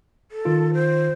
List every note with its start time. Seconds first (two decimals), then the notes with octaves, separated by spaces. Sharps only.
0.32 A4
0.45 D#3 F4
0.74 C5